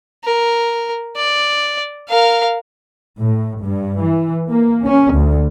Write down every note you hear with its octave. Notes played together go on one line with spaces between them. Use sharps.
A#4
D5
A#4 F5
A2
G2
E3
A#3
C#4
D2